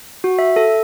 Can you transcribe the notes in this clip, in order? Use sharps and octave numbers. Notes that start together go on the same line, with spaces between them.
F#4
E5
A4